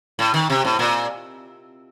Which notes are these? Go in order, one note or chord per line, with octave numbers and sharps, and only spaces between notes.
A2
D#3
C3
A2
A#2